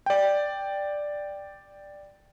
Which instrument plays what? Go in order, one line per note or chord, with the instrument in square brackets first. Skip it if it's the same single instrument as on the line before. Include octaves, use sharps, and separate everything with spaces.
[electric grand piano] D5 G5